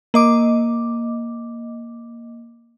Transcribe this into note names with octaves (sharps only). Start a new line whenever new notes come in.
A#3 D#5 D6